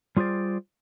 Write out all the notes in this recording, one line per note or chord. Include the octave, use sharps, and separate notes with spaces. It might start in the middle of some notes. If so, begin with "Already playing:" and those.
G3 F4 G#4 C5 D5